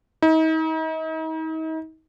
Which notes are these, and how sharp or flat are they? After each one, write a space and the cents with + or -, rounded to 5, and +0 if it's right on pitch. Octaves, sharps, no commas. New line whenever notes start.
D#4 +40